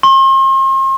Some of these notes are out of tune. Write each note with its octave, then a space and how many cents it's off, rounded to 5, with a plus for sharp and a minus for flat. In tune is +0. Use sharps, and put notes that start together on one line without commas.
C6 +40